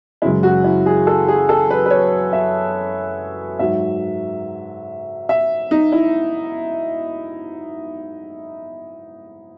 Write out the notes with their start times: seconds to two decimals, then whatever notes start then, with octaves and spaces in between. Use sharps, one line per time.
0.22 F#2 C#3 E3 G#3 E4
0.43 F#4
0.64 E4
0.86 G#4
1.07 A4
1.28 G#4
1.49 A4
1.70 B4
1.86 B4
1.90 C#5
2.33 E5
3.59 G#2 F#3 E5
5.29 E5
5.71 D#4
5.92 E4